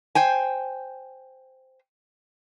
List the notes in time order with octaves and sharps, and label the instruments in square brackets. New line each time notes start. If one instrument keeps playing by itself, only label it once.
[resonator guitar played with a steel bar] C5 G5 G#5